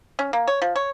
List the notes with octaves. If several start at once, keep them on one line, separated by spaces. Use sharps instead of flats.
C#4
A#3
C#5
F3
C#5